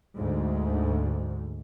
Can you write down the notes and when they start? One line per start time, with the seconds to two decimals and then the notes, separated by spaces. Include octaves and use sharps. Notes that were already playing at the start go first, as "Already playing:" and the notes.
0.18 D2 G#2